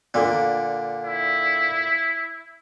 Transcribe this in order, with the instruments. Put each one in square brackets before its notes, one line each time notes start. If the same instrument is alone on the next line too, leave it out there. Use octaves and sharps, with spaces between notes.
[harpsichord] A#2 D3
[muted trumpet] E4